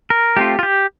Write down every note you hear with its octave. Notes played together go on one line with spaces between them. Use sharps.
A#4
A3 C4 F4 G4
F4
G4